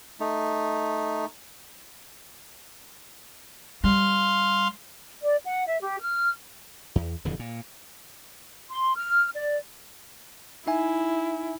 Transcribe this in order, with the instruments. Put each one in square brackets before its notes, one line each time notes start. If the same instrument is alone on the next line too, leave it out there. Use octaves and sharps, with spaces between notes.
[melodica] A3 D#4
[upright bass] G3 [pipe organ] F5 C6
[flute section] D5
F#5
E5
G4
F6
[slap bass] E2
D#1 F2 D3 E3
A#2
[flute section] C6
F6
D5
[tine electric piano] D#4 E5 G#5 [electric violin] E4